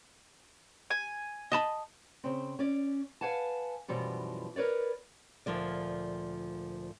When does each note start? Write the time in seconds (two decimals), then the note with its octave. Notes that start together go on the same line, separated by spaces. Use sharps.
0.90 G#5
1.52 D#5 A5 B5
2.24 C#3 C4
2.59 C#4 D5
3.21 B4 F5 F#5 G#5 A5
3.88 F#2 B2 E3 F3 G3
4.56 A#4 B4 C#5 D5
5.46 D2 A#2 F3 A#3 D5